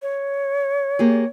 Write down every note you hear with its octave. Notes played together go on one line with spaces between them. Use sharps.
C#5
A#3 G4 G#4